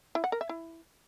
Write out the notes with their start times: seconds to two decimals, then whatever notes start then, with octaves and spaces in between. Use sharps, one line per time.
0.15 E4
0.24 F#5
0.32 A#4
0.41 E5
0.49 E4